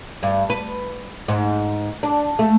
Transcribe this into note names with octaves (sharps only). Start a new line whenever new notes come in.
G2
B4
G#2
D4
A3